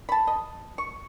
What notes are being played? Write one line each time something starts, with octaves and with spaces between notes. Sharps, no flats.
A5 B5
D#5
C#6